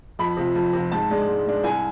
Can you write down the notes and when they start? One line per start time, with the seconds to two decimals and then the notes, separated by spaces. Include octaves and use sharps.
0.19 F2 B5
0.37 C3 F3
0.55 F2
0.73 C3 F3
0.92 G#2 A5
1.10 G#3 D4
1.28 G#2
1.46 G#3 D4
1.64 C2 G#5